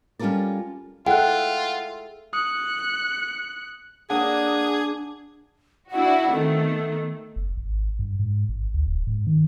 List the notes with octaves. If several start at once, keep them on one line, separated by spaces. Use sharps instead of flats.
G3 C#4 F4 A4 A#4 D5
F4 G#4 A4 E5 F#5 G5 F#6
D#6 F#6 C#7
A#3 D4 G#4 F#5 D#6
D4 E4 F#4 F#5
D#3 A3 C4
B3
F#1
G#1
G2
G#2
G#1
D2
D1
G#2
D#3